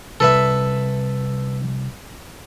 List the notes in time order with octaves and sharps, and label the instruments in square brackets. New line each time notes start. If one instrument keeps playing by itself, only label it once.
[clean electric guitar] C2 [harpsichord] A4 B4 E5